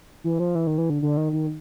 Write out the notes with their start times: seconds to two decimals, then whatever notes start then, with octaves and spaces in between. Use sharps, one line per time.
0.24 E3
0.40 F3
0.55 E3
0.67 D#3
0.78 E3
0.90 D3
1.02 D3
1.17 D#3
1.32 D#3